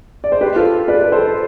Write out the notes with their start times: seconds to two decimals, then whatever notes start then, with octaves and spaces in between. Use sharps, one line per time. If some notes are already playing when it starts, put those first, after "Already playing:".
0.24 D5
0.32 C5
0.41 G4 B4
0.56 F4 A4
0.88 B4 D5
1.12 A4 C5